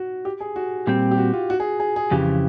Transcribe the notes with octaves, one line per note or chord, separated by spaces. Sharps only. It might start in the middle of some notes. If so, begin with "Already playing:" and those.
Already playing: F#4
G4
G#4
F#4
A#2 G3 C4 G4
G4
F#4
F4
F#4
G#4
G#4
G#4
F2 C#3 E3 G4